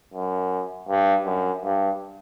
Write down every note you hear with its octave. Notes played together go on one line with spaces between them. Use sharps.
F#2
G2
F#2
G2